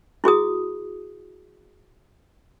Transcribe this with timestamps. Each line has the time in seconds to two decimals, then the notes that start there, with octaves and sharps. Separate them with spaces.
0.24 E4 F#4 G#4 D#6